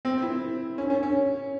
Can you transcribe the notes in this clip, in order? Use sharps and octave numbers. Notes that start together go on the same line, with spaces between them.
C4
E4
C#4
C#4
C#4